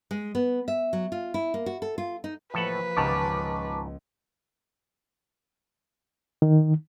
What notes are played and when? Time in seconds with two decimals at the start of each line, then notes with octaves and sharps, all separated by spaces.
0.11 G#3
0.35 B3
0.68 E5
0.93 F#3
1.12 F4
1.34 E4
1.54 A#3
1.66 F#4
1.82 A4
1.98 F4
2.24 D#4
2.54 A2 F3 A#3 A4 B4 F#5
2.97 C#2 G#2 D#3 G#3 A5 C#6 D6
6.42 D#3